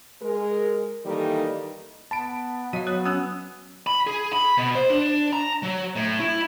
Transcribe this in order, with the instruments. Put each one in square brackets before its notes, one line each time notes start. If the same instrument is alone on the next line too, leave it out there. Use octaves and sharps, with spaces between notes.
[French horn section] G#3 G#4 A#4
D#3 E3 G3 A#3 D#4 A4
[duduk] B3 [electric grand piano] A5 B5 D7
[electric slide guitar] F#3 [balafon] D#5 F5 [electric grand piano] D#7
[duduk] B3 [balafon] C#5 [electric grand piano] D#6 F#6
[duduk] B3 [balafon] C#4 [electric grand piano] D#6 E6 F#6
[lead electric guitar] B5
G#4
B5
B2
C5
D4
A#5
F#3
A2
E4